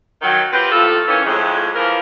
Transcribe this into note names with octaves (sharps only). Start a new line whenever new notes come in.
D#3 F#3
C4 F4 G4 A#4 B4
D#2 A2 F3 A3 F4 A4
D#3 E3 A#3 C#4
F2 A2 G#3
E3 F3 A#4